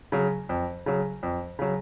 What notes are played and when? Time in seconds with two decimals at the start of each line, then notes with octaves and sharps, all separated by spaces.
0.12 C#3 F#3
0.49 F2
0.86 C#3 F#3
1.23 F2
1.59 C#3 F#3